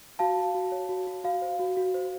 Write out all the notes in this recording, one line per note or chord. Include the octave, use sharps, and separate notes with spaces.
F#4 F5 A5
F#4
F#4
C#5
F#4
F#4
F#4 F5
C5
F#4
F#4
C5